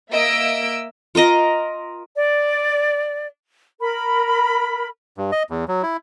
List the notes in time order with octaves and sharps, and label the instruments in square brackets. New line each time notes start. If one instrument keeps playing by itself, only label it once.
[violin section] A#3 D#5 E5 E6 D7
[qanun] F4 A#4 D#5 A#5
[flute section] D5
A#4 B5
[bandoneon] G2
D#5
E2
F#3
E4